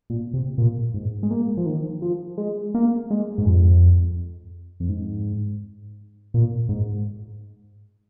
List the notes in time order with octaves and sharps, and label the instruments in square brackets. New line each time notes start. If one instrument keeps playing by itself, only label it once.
[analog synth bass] A#2
C3
A#2
G#2
G#3
A#3
F3
D#3
F3
G#3
A#3
G#3
G#2
F2
F2
G#2
A#2
G#2